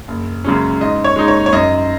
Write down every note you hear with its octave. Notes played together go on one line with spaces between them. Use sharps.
F#1
F#2 C#3 G#3 C#4
G#2 D#5
C#5
G#3 D#4
C#5
C#5
F#2 D#5